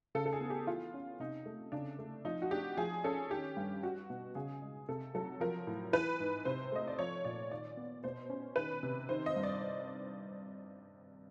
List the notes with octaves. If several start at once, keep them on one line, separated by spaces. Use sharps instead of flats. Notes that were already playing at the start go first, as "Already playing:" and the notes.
C#3 A4
A4
G#4
B3
G4
E3 F4
C#4
C3 D#4
A3
C#3 D4
A3
F3 D#4
F#4
D4 G4
F3 G#4
C#4 A4
D#3 G4
G2
G3 F#4
B2
C#3 G#4
G#3
C3 A4
F#3 A4
F3 A#4
A2
E3 B4
G#2
C3 C5
A3 D#5
D5
F3 C#5
A#2 D5
D#3 D5
B3
B2 C5
C#4
D#3 B4
C3
D#3 C5
D#5
G2
D5